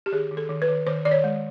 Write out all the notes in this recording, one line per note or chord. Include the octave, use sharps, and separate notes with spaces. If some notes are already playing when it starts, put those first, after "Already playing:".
G4
D#3 G#4
D#3
A4
D#3
B4
D#3
D#3 C5
D#3 D5
C#5
G#3